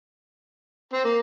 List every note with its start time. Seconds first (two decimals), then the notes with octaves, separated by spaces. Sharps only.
0.93 C4
1.04 A#3